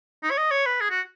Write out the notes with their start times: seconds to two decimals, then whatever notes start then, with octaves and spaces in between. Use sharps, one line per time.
0.23 D#4
0.31 C#5
0.38 D#5
0.51 C#5
0.66 B4
0.81 G#4
0.90 F#4